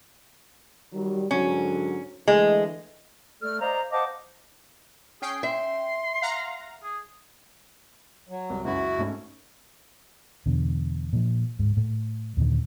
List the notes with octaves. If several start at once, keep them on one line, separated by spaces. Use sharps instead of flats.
D#3 F#3 G3
G#2 D3 F#3 C#4
D3 E3 G#3 A3
A3 A4 D5 F6
C5 D5 D#5 F5 A#5
C5 D#5 F5 F#5 A5 D6
C#4 G#4 G5 C7
E5 C6
F5 F#5 A#5
G#4
F#3
C2
C#2 F#2 E4 F#4
G#2 A3 C#4
E2 B2 D3
A#2 F3
D1 G#2
A2
D#2 A#2 D3 D#3